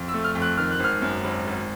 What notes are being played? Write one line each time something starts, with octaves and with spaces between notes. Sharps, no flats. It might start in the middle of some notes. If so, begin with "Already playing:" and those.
Already playing: F2
E6
A3
F6
F2
F#6
D#3 F6
F#6
G#1 F6
F#2
G#1
G#1